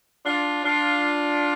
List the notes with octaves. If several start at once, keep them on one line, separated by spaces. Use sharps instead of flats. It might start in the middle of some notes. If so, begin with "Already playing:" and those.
D4 F4
D4 F4